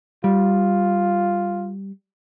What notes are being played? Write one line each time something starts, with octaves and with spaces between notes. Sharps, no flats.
G3 F4